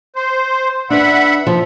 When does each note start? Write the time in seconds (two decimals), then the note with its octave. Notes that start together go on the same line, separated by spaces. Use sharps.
0.16 C5
0.90 D4 B4 E5 F#5 B5
1.47 F3